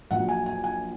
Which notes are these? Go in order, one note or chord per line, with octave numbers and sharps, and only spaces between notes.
A#1 A#2 F#3 F#5
G#5
G#5
G#5